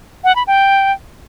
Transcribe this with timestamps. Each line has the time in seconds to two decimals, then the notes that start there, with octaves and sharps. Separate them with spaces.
0.24 F#5
0.36 B5
0.47 G5